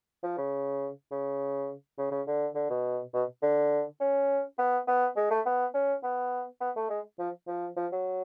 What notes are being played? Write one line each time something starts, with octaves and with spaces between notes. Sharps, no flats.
F3
C#3
C#3
C#3
C#3
D3
D3
B2
B2
D3
C#4
B3
B3
G#3
A3
B3
C#4
B3
B3
A3
G#3
F3
F3
F3
F#3